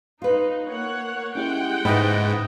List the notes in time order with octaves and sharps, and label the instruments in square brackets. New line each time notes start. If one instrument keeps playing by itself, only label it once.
[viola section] D#4 [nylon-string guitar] F4 B4
[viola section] A#3 C#5 F#5
[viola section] G#3 F#5 G5 [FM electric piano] C#4 E4 G4
[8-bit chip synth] G#2 [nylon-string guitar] C#3 E4 B4 [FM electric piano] B5 D#6 A#6